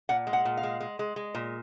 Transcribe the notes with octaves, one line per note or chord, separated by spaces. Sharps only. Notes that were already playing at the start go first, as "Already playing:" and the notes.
A#2 F#5
G#3
F#5
A#2
F5
G#3
G#3
G#3
G#3
A#2